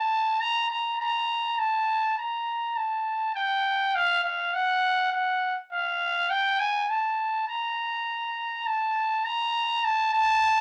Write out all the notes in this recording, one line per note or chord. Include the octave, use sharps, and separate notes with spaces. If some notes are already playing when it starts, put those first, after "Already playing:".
Already playing: A5
A#5
A#5
A#5
A5
A#5
A5
G5
F5
F5
F#5
F#5
F5
G5
G#5
A5
A#5
A5
A#5
A5
A5